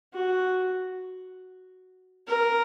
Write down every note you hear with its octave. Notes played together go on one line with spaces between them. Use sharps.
F#4
A#4